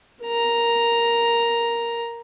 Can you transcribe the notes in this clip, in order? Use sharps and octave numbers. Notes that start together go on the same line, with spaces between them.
A#4 A#5